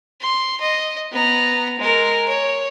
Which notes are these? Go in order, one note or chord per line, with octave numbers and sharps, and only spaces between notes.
C6
D#5
B3 A#5
G#3 A#4
C#5